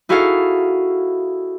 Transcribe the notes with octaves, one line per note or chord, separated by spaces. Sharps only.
D#4 E4 F#4 G#4 A4 F5